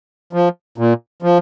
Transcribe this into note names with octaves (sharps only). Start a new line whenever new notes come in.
F3
A#2
F3